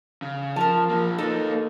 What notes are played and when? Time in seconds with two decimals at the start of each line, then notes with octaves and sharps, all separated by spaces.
0.22 C#3
0.56 F3 A#4 A5
0.89 F3 A#3
1.18 A#3 D#4 A4 B4